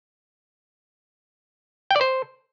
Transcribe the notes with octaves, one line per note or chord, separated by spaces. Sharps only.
G5
D5
C5